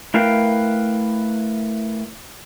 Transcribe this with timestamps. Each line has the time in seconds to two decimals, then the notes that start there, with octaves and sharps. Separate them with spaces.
0.14 A3 E4 A#4 B4 F5 G5